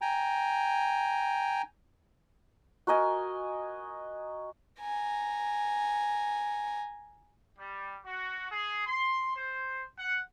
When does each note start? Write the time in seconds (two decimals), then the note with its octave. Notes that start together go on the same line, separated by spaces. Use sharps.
0.01 G5 G#5 A#5
2.87 F#4 A#4 D#5 G#5
4.80 G#5 A#5
7.59 G3
8.05 F#4
8.51 G#4
8.86 C6
9.35 C5
9.97 F#5